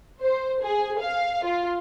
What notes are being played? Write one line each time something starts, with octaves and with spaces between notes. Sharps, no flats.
C5
G#4
F5
F4